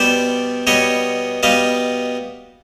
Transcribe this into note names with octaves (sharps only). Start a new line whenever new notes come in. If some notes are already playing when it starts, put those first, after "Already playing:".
Already playing: B2 G3 B3 C5 D5
B2 G3 B3 C#5 D#5
B2 G3 B3 D#5 F5